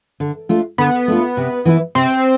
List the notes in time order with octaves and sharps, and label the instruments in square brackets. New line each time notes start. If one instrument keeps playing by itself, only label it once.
[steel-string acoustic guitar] D3
A3 D4 F4
[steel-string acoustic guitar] D3 [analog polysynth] B3
[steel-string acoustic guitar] A3 D4 F4
C3
E3 B3 E4 B4
[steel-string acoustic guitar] C3 [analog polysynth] C4